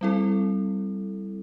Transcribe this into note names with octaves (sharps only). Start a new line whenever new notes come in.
G3 C4 E4 A4